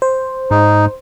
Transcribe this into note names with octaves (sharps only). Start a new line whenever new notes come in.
C5
G#2 D#4